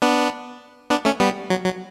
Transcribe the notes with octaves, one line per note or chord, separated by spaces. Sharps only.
B3 D4
B3 D4
A3 C#4
G3 B3
F#3
F#3